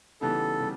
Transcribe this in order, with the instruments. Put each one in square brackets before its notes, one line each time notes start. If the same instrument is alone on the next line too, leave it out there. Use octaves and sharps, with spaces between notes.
[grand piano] C#3 E3 G3 B3 D#4 [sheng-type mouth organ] A4
[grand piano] C#3 G3